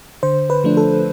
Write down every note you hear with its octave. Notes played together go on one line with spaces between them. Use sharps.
D3 C5
B4
F3 A3 D4
A4